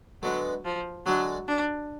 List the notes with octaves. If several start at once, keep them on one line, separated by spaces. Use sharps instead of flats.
D3 F#3 G#3 B3
F3
D3 F#3 G#3 D4 G#4
D4